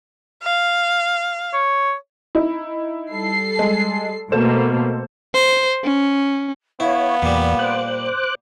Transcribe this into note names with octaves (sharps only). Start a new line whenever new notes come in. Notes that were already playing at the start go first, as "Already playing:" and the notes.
F5
C#5
D#4 E4
G3 A4 C7
G#3
B2 A3 A#3 A4 C5 E7
C5
C#4
B3 E4 C#5 F5
E2 A#2 G3
C5 D6 F#6